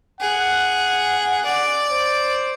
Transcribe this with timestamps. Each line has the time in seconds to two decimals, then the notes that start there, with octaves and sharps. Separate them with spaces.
0.21 G#4 F#5
1.45 D5
1.91 C5